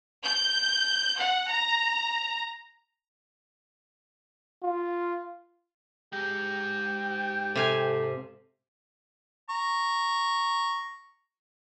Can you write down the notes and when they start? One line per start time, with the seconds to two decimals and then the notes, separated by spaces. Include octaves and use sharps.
0.24 G6
1.19 F#5
1.50 A#5
4.63 F4
6.13 G#2 G#3 G4
7.55 C3 A4 F5 G#5
9.50 A#5 C#6